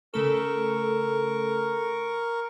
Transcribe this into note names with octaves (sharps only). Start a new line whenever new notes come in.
C#3 A3 A4 A#4 C#6